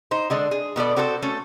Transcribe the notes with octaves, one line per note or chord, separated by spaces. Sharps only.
D#4 C5
D3 G#3 D4
G#4
B2 B3 A4 D5
C4 F#4 A4 B4 C5
A3 C#4 A4